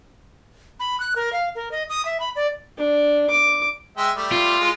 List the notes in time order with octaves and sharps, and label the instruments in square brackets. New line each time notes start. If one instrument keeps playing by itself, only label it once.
[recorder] B5
F#6
A#4
F5
A#4
D#5
D#6
E5
B5
D5
[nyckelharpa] D4
D6
[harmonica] G#3 E5 G5
G3 A3
[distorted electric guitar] F4
[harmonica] G#3